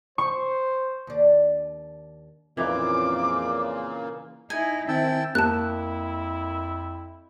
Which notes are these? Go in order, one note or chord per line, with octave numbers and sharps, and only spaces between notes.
C5 C#6
D#2 D4
F2 A#2 C#3 E3 A#3 D#4 B4 D6
D#4 E4 G#5
D#3 C4 E4 G5 A5 E6
F2 A#3 E4 A5 F#6